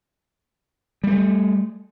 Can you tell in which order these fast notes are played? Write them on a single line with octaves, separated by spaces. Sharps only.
G3 A#3 A3